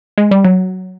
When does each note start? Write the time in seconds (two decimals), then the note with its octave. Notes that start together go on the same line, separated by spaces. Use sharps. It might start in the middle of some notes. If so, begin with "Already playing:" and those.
0.18 G#3
0.31 G3
0.45 F#3